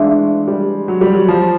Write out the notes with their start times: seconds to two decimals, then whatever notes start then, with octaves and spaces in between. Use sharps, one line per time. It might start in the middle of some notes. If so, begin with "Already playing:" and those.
Already playing: E3 G#3 A3 D4 F4
0.48 G3
0.88 F#3
1.01 G3
1.13 F#3
1.28 F3